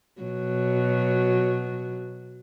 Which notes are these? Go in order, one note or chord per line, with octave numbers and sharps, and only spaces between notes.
B2 F#3